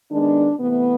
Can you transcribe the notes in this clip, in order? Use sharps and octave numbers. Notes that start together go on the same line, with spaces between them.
D#3 G#3 B3 D4
C3 E3 A3 B3